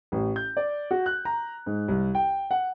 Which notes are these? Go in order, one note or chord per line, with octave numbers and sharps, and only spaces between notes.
A1
G6
D5
F#4
F#6
A#5
G#2
C2
G5
F#5